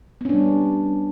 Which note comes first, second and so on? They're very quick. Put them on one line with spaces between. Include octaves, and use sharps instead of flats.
B3 C#4 D4 G3